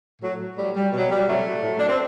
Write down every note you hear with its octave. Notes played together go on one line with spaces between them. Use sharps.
A2 F#3
A2 F#3 G3
G3
B2 F#3
G3
A2 C3 F#3 A3
A2 F#3
D4
C4